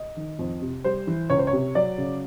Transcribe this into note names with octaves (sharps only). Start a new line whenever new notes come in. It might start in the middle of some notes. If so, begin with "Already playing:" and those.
Already playing: D#5
D#3
F2
C3
G3 C5
E3
C#2 C#5
C5
C#5
C3
F#3 D5
C#3